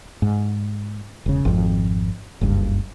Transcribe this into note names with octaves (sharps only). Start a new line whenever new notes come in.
G#2
E1 C#3
G#1 F2
F#1 C#2 G2